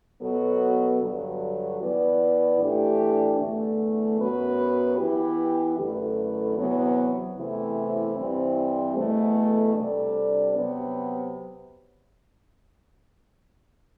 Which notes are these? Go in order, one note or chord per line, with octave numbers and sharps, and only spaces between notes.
B2 F#3 B3 F#4 A4
G2 D3 F#3
E3 B3 E4 B4 D5
A2 E3 A3 D4 G4
E2 D3 A3
F#2 F#3 B3 F#4 B4
E3 B3 E4 G4
F#2 D3 A3 E4 B4
E2 C3 F#3 B3
E2 C3 E3 A3 E4
G2 E3 G3 C4
E2 B2 A3
C3 G3 D4 A4 D5
C3 F#3 B3